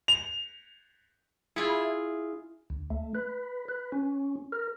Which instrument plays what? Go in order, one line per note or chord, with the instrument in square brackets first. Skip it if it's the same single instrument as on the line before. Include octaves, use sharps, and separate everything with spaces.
[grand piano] F7
[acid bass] E4 [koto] F4 G#4
[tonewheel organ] D2
A3
B4
B4
C#4
A#4